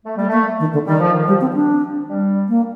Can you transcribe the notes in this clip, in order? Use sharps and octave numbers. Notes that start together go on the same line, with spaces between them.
A3
G3 A3
A3 A#3
D#3
D3
D#3 G3
F3
D#3
F3 G3
C4
D4
G3
A#3